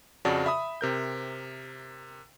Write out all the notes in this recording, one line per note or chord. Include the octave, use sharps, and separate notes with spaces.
F2 C#3 F#4 D5 A5
E5 B5 D#6
C3 A#4 G6